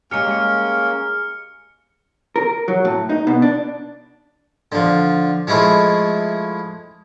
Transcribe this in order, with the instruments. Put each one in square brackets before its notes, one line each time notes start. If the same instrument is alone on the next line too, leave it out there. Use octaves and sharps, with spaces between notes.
[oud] G#3 G4 [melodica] A#3 C#4 [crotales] F6 C#7
[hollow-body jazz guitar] A#4
F#3
A2
D#4
B2
D4
[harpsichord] D3 F3
F3 G#3 A3 E4